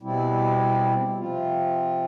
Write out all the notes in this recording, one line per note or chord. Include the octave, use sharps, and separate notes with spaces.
B2 G3 C4 E4
C3 F3 C4 F4